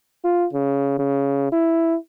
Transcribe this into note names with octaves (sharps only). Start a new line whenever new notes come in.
F4
C#3
C#3
E4